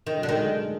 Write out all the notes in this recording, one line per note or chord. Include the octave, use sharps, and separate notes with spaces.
D3 D#3
F#3
D3
D#3 G#3
A3
A3